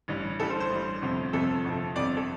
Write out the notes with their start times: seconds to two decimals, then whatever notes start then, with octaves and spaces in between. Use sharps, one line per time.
0.08 A1 G2 G3
0.40 A1 G2 G3 A4
0.50 C5
0.60 C5
0.71 A1 G2 G3
1.02 G1 F2 C3 F3
1.33 G1 F2 C3 F3 A4
1.64 G1 F2 C3 F3
1.95 G1 F2 C3 F3 D5
2.17 A4